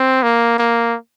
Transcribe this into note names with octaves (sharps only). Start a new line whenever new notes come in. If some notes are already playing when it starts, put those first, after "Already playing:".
Already playing: C4
A#3
A#3